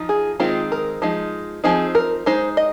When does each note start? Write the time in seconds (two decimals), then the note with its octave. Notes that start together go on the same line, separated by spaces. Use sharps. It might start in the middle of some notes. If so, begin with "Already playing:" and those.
Already playing: F3 D#4
0.09 G#4
0.40 D#3 G#3 C4 D#4 F4
0.72 A#4
1.02 F3 G#3 D#4
1.64 F3 C4 D#4 G#4
1.95 A#4
2.26 G#3 D#4 C5
2.57 D#5